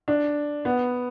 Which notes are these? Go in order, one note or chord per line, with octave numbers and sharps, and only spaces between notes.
D4
B3